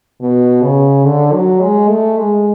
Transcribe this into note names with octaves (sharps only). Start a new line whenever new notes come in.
B2
C#3
D3
F#3
G#3
A3
G#3